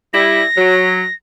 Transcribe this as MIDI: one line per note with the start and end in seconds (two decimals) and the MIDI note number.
0.13 0.42 55
0.13 0.42 64
0.13 1.14 94
0.56 1.02 54